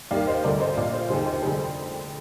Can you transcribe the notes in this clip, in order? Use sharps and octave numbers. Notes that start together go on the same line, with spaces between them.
D#2 D#3 D5 F5
C5 D#5
D2 D3 A#4 D5
C5 D#5
A#1 A#2 D5 F5
C5 D#5
D#2 D3 G#4 C5
C5 D#5
F1 F2 D3 G#4 C5